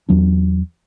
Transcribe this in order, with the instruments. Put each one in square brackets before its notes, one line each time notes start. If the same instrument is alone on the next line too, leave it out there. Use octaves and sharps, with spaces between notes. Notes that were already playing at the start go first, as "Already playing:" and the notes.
[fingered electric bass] E2 F#3 D4